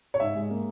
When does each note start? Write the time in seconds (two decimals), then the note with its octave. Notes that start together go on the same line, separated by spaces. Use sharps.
0.14 C#5
0.20 G#2 E5
0.35 G#3
0.50 A#3